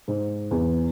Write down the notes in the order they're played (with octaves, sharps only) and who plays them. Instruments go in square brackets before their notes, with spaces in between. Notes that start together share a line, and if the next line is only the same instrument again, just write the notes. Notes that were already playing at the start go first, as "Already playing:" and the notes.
[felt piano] G#2
E2